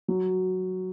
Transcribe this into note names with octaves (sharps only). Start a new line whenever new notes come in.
F#3